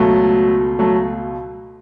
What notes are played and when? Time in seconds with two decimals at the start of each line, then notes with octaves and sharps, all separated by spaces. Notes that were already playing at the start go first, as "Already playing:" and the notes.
Already playing: C#2 B2 F#3 A3
0.79 F#3 A3